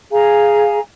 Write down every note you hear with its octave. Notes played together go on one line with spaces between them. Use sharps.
G#4 F5 G#5 A#5